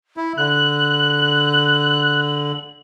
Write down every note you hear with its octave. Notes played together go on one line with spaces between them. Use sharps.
E4
D3 F#6 F#7